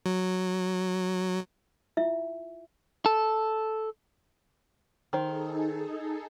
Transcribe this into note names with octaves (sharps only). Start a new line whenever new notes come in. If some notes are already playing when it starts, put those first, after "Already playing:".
F#3
E4 F4 E5
A4
D#3 D#4 G#4 A4 C5